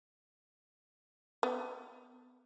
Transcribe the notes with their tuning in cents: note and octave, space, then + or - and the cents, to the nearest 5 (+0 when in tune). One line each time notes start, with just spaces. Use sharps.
B3 +30